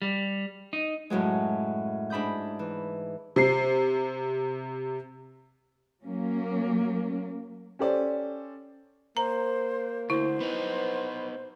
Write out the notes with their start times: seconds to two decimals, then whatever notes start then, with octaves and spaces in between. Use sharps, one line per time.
0.02 G3
0.73 D#4
1.10 F#2 A2 F#3 G#3
2.10 G#2 D4 B5 D#6 G6
2.59 E3
3.36 C3 C7
6.04 F#3 A#3 C#4
7.79 C#4 G4 A4 C5 D5
9.17 A#3 C5 A#5
10.10 D2 E4 C5
10.40 B3 D#4 B4